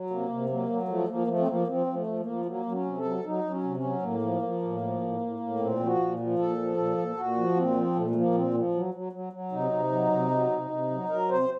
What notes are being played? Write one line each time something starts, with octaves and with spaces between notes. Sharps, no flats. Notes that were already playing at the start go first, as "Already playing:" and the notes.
Already playing: F#3
C3 A#3
C3
F#3 A#3
F#3
A#3
F3 A3
F3 A#3
F3 A3
C4
F3 A#3
F3 C4
F3
A3
F3
A#3
F3
F#3 A#3
F#3
C#4
C3
A4
F#3
F#3 D#4
F#3
C#4
C3
C#4
F#3
A2 A#3
F3
F3
A2
F3
A2
A2
A2
A#2 C4
F3
F#4
A#2
F3
A#2 A4
F3
A#2
A#2
A#2 F#4
F3
A#2 C4
F3
A#2 A3
A3
F3 A#3
A#2 C4
F3
F#3
F#3
F#3
F#3
C3 D#4
C3
F#3
C3
F#3
C3
C3
F#3
F#3 A#4
C3 C5